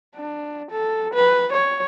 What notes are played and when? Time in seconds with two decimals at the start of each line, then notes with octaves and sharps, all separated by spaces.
0.16 D4
0.71 A4
1.13 B4
1.52 C#5